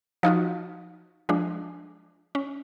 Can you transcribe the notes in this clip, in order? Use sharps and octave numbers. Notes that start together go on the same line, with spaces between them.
F3 D#4 F4 F#4
F3 G#3 D4
C#4